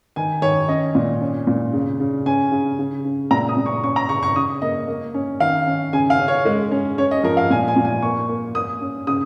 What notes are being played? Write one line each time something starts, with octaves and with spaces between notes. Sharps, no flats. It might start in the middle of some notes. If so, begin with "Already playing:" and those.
D#3 G#5
D#3 C#5
C#4 D#5
A#2
C#4
A#2
C#3
C#3
C#4 G#5
C#3
C#3
C#3
A#2 A#5
D#6
A#2
C#6
C#4 C#6
A#5
C#3 C#6
C#6
C#3 D#6
A#3 D#5
A#3
C#4
D#3 F5
C#4
C#3 G#5
F5
C#4
C#5
G#3
C#4
C#4 C#5
D#5
F3 A#4
F5
A#2 G#5
G#5
A#2
G#5
A#3 C#6
A#3
A#3 D#6
C#4
C#3 D#6